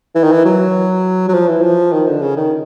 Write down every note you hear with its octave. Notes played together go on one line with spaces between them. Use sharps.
E3
D#3
E3
F#3
F#3
F3
E3
F3
D#3
D3
C#3
D#3